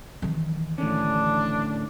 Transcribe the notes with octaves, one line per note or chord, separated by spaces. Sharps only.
D#3 E3
A2 D3 C#4 D4